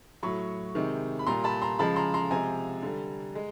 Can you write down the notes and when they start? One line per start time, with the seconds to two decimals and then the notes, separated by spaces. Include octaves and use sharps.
0.23 A2 F#3 B5 C#6
0.75 C3 D#3 G#3
1.19 B5
1.27 A#2 G3 A#5 C6
1.44 A5 B5
1.62 A#5 C6
1.79 C#3 F3 G#3 A5 B5
1.96 A#5 C6
2.14 A#5 C6
2.31 C3 F3 G#3 G#5 A#5
2.82 D3 G3
3.35 G#3